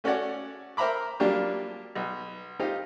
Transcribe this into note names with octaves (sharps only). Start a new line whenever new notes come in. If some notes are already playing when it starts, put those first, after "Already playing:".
A3 C#4 F#4 C#5 D5 F#5
A#4 C5 E5 A#5 B5 D6
F#3 G3 A#3 D4 F4 G4
B1
D#4 F4 G4 C5